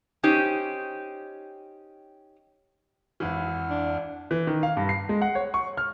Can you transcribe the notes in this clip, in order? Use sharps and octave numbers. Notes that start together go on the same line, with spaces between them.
C#4 D#4 G4 C5
G#1 F2 E3 F#5 F6
D4
E3
D#3
F5
G2
C7
G#3
F#5
C#5
C#6
F6